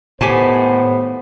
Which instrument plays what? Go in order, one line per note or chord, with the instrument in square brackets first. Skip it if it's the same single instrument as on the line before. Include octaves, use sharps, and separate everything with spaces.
[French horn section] D#2 C5 [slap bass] A2 [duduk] B3 [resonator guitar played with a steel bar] G4 G#5 A5